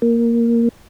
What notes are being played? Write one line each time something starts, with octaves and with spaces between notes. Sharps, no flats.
A#3